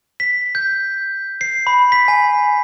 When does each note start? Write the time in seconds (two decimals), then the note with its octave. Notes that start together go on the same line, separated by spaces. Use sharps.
0.20 B6
0.55 G6
1.41 C7
1.67 B5
1.92 B6
2.08 G#5